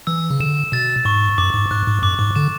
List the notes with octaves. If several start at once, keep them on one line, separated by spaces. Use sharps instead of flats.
E3 E6
C#3
D3 E7
B2 A6
G#2 C#6
F#2 D6
G#2
G#2 F#6
G#2
F#2 D6
G#2
D3 E7